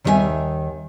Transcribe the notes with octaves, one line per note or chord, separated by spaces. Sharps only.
D#2 D#3 G3 F4 E5 G#5